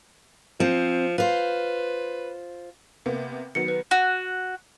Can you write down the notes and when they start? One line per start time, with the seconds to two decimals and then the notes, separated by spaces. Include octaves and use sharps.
0.60 F3 C4
1.18 F4 B4 C5
3.06 C3 A#3 B3
3.55 D#3 F#3 B3 C#7
3.68 B4
3.91 F#4